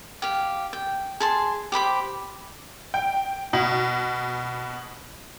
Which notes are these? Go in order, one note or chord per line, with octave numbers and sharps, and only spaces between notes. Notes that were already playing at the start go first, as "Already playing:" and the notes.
G4 F5
G5
G#4 A5 C6
G4 C5 B5 D6
G5
B2